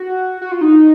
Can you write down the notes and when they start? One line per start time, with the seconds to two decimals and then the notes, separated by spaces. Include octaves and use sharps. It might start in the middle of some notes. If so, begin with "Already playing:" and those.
Already playing: F#4
0.41 F#4
0.52 F4
0.61 D#4